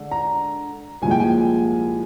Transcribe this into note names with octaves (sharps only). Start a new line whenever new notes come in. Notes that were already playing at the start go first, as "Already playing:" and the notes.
Already playing: D3 G#3
A#5
C2 A#2 F3 G#3 G#5
G5
G#5